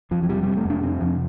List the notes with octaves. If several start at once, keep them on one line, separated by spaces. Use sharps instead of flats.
F2 F3
F3
C3 G3
C3 G3
A3
F2 D4
C3 C4
F2 F3